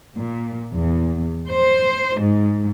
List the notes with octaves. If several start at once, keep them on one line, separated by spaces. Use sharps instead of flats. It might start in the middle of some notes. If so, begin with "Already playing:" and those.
A#2
E2
C5
G#2